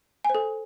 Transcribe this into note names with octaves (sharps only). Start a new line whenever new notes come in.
G#5
C5
A4